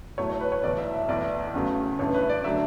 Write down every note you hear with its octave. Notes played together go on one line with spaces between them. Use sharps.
B1 A2 F#3 A3 C#5
C#5
B4
C#5
B1 A2 E3 D5
E5
E5
B1 A2 E3 D5
E2 C#3 F#3 A3
A1 G2 E3 A3 C#5
B4
D5
D3 F#3 A3 E5